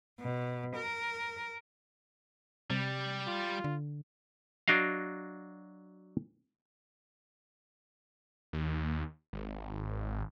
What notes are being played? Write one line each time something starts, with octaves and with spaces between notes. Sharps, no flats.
B2
A#4
C3 G3
F4
D3
F#3 D4 F#4 D#5 F5
D#2
G#1